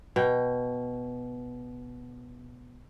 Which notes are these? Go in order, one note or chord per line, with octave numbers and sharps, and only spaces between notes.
B2 G5